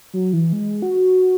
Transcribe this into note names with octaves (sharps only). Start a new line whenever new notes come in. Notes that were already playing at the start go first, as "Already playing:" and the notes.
F#3
E3
G#3
F#4